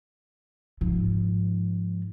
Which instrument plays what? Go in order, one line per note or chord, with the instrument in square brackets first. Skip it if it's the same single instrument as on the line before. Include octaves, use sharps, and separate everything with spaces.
[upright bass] G#2 F3